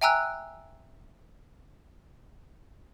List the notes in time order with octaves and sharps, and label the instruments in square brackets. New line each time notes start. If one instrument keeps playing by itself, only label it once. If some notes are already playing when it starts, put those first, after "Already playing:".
[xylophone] E5 G5 G#5 A#5 E6 F#6